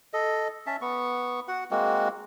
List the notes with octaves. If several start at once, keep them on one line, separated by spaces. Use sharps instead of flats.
A4 D#5
C#4 E5 A5
B3 C#6
F#4 F#5
G#3 A#3 C4 F#4